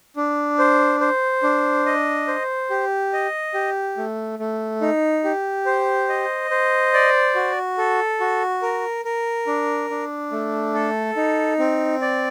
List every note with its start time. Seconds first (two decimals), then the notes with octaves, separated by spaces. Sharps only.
0.16 D4
0.59 C5
1.01 C5
1.43 D4
1.86 D#5
2.27 C5
2.70 G4
3.13 D#5
3.54 G4
3.97 A3
4.39 A3
4.81 D#4
5.24 G4
5.66 C5
6.09 D#5
6.51 C5
6.93 D5
7.35 F#4
7.78 A4
8.20 F#4
8.62 A#4
9.05 A#4
9.47 D4
9.90 D4
10.32 A3
10.74 A4
11.16 D#4
11.59 C4
12.02 D5